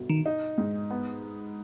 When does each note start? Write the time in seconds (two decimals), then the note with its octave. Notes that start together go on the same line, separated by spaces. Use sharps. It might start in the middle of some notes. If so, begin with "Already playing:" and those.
Already playing: G1 B2
0.10 D#3
0.26 D#4
0.58 G#2
0.91 B3